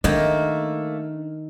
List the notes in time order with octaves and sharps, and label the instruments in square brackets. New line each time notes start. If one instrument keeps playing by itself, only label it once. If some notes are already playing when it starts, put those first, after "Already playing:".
[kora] D#3 [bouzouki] A3 A#3 [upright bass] D4